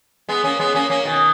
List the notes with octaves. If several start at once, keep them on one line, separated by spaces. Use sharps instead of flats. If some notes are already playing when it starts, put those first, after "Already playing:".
G#3 B3
A#3 C#4
G#3 B3
A#3 C#4
A#3 C#4
B2 D#3